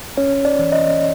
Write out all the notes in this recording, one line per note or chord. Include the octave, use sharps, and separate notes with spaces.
C#4 C#5
D5
E3
D#5